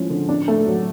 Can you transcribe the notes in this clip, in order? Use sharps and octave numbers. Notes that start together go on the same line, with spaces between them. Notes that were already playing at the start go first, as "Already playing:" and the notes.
Already playing: A2 F3 G#3 C#4
D3
D4
A3
F#3